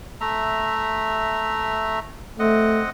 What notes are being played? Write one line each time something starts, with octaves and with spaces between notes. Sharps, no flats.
A3 E5 A#5
A3 C4 D#5 F#5